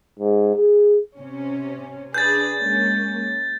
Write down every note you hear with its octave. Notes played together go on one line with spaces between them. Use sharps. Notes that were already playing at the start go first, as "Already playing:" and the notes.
G#2
G#4
C3 C#4
D4 G#4 B4 G6 A6
G#3 A#3 C#4